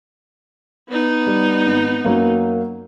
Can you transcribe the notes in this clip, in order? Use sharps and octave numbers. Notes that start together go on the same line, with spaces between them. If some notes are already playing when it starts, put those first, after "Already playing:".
B3 D#4
G3
G#1
F#2 F#3 A#3